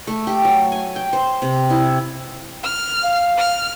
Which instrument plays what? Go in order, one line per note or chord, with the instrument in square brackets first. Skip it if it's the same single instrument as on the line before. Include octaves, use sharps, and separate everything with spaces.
[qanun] A3
G4
F#3
G#5
G5
C5
C3
E4
[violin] F6
[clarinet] F5
[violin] F6